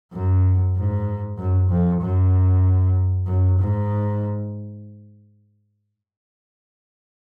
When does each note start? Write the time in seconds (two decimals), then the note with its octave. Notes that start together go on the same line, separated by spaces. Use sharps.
0.13 F#2
0.76 G#2
1.38 F#2
1.70 F2
2.02 F#2
3.27 F#2
3.59 G#2